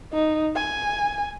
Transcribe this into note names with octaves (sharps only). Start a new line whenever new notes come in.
D#4
G#5